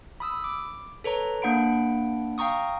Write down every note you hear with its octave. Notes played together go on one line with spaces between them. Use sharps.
B5 D#6 E6
D6
A4 B4 C#5 A#5
A#3 D4 F#5 B5 D7
F5 G5 A#5 C#6 D#6